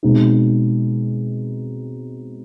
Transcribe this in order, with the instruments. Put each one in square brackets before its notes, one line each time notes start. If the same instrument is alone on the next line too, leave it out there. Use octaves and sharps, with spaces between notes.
[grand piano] B2 G#3 C4 D#4